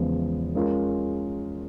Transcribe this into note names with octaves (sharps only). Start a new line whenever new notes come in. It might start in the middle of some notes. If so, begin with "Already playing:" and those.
Already playing: E2 C#3 F3 G#3 B3
G#3 C#4 F4 A#4